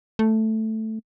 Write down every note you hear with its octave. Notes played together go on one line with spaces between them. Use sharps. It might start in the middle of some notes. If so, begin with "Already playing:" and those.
A3